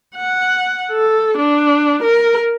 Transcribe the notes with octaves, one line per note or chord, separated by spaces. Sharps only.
F#5
A4
D4
A#4